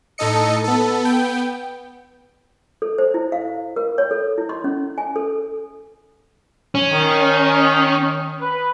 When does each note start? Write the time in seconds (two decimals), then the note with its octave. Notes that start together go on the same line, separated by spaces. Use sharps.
0.18 A2 D#4 A4 D#5 C#7
0.64 B3 A4
1.01 B3 G5
2.82 A4
2.98 C5
3.14 E4
3.32 F5
3.76 A#4
3.98 C#5
4.11 A4
4.38 E4
4.49 C6
4.64 C#4
4.98 G#5
5.16 A4
6.75 C#4
6.91 D#3
8.40 B4